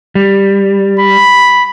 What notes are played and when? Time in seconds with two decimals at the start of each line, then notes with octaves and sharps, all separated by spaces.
0.15 G3
1.00 B5